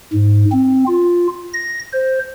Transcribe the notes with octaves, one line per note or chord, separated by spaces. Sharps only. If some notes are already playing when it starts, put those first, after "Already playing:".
G#2
C4
F4
A#6
C5